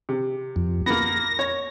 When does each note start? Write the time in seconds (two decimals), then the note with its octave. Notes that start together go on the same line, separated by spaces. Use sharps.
0.09 C3
0.56 F2
0.86 A#3 B3 A#6
1.39 C#5